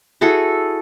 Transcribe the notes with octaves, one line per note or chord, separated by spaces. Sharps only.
E4 F#4 G#4 A4